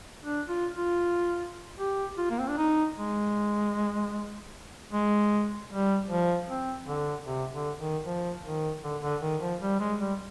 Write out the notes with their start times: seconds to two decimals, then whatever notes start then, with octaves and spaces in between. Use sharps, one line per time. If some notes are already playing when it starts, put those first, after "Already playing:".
0.24 D4
0.49 F4
0.75 F4
1.79 G4
2.18 F4
2.30 A#3
2.40 C4
2.48 D4
2.57 D#4
2.97 G#3
4.91 G#3
5.70 G3
6.10 F3
6.48 C4
6.87 D3
7.26 C3
7.53 D3
7.79 D#3
8.04 F3
8.44 D#3
8.83 D3
9.02 D3
9.22 D#3
9.41 F3
9.61 G3
9.80 G#3
10.00 G3